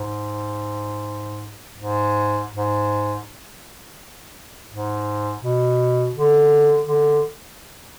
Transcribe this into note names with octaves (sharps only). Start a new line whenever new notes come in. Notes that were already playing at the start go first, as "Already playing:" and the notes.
Already playing: G#2
G#2
G#2
G#2
B2
D3
D3